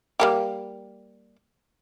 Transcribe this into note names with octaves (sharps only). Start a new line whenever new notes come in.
G3 A#3 G4